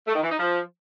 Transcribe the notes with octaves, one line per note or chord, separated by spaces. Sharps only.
A3
D#3
E3
D#4
F3